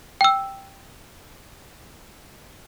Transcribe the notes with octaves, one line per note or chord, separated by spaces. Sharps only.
G5 E6